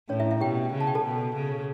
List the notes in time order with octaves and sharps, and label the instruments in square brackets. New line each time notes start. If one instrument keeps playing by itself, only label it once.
[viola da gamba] A2 [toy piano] C#4 C#5
[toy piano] E4 E5
E4 E5
[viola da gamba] B2 [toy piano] G4 G5
[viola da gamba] C#3
[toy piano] A5
G5
A4 A5
[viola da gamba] B2
C#3